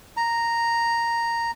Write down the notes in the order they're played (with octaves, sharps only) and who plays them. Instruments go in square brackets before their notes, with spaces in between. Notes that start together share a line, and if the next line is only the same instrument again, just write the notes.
[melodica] A#5